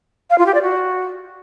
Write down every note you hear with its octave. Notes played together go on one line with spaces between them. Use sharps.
F5
F4
G4
D5
F#4